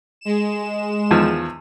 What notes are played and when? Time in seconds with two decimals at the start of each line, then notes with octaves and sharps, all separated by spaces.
0.21 G#3 E7
1.11 E2 D#3 F3